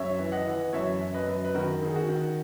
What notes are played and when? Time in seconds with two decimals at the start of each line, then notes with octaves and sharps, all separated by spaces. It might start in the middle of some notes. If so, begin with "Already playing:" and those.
Already playing: F#2 C#5 E5
0.19 E3
0.32 D#5 F#5
0.47 E3
0.73 F#2 C#5 E5
1.01 F#2
1.14 B4 D#5
1.28 F#2
1.45 B4
1.55 D#3 F#4 A#4
1.82 D#3 G#4
1.96 F#4
2.09 D#3